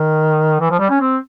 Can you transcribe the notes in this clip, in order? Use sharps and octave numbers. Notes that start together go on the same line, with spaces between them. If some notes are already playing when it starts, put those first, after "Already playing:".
Already playing: D#3
E3
F3
G3
C#4
C4